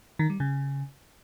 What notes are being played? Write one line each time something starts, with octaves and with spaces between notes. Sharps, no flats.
D#3
G3
C#3